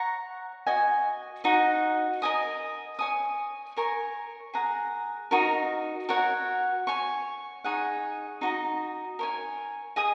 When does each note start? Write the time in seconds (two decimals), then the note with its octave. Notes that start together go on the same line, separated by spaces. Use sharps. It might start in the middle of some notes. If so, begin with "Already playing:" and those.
Already playing: C#5 F#5 A#5 C#6
0.67 F#4 D#5 G#5
1.44 D#4 F#4 D#5 F#5
2.22 A#4 D#5 G#5 D#6
2.99 C#5 G#5 D#6
3.76 A#4 C#5 G#5 C#6
4.54 G#4 F#5 A#5
5.31 D#4 F#4 A#4 D#5
6.09 F#4 A#4 C#5 F#5
6.87 C#5 G#5 C#6
7.64 D#4 G#4 C#5 F#5
8.41 D#4 F#4 D#5 A#5
9.19 A#4 C#5 G#5
9.96 G#4 D#5 G#5 D#6